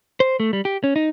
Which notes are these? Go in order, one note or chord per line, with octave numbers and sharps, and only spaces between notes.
C5
A3
G3
G4
C#4
D#4